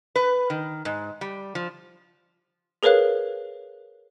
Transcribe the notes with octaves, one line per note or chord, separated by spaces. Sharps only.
B4
D#3
G#2
G3
F3
G#4 A#4 B4 C#5 F5 F#6